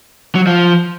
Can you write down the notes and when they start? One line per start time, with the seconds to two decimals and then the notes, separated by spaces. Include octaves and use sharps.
0.35 F#3
0.47 F3